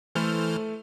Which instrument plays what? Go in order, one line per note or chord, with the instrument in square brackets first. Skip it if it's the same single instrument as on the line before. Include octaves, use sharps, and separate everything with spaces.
[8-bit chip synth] E3 C5 F6 [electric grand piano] A3 A4